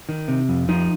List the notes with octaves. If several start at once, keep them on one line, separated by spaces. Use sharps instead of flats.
D#3
C3
F2
F3 D#4